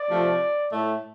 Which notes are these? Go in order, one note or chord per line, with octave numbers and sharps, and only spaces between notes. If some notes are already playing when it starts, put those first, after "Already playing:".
Already playing: D5
C3 F3 A3
A2 A3